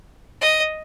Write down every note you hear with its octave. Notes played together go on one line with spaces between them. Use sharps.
D#5